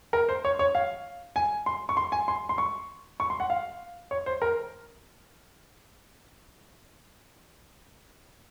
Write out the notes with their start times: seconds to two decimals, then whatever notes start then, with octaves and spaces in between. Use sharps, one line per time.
0.13 A#4
0.29 C5
0.45 C#5
0.59 C#5
0.75 F5
1.36 G#5
1.66 C6
1.89 C#6
1.97 C6
2.12 G#5
2.28 C6
2.49 C6
2.58 C#6
3.20 C#6
3.30 C6
3.40 F#5
3.50 F5
4.11 C#5
4.26 C5
4.42 A#4